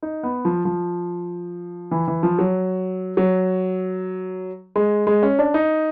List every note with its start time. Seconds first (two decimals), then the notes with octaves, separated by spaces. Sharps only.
0.03 D#4
0.23 B3
0.45 F3
0.65 F3
1.91 E3
2.08 E3
2.23 F3
2.39 F#3
3.17 F#3
4.76 G#3
5.07 G#3
5.23 C#4
5.39 D4
5.54 D#4